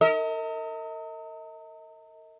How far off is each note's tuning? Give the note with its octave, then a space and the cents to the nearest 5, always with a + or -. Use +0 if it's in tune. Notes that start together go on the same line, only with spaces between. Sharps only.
A#4 -40 D#5 +40